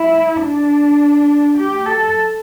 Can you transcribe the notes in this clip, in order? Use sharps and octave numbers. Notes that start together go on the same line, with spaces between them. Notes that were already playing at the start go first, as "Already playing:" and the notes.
Already playing: E4
D4
G4
A4